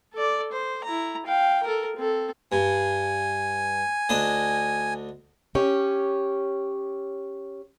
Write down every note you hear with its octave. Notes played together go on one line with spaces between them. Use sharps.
A4 D5
C5
E4 A#5
F5 G5
A4 A#4
C4 A4
G2 G#5
D2 D4 D#5
C#4 G4 C#5